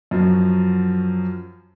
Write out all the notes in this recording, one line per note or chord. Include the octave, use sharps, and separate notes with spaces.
F#2 F3 F#3